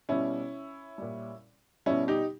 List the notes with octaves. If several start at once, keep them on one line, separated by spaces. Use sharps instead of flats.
B2 G3 C#4 E4
A#2 G3
B2 G3 C#4 E4
D#4 G4